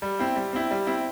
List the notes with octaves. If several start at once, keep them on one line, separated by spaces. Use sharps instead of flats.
G3
C4 E4
G3
C4 E4
G3
C4 E4